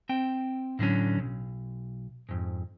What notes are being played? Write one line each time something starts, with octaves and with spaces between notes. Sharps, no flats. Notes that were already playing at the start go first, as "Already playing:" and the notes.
C4 G5
A2 D3 F#3 C#4
B1
F2 G#2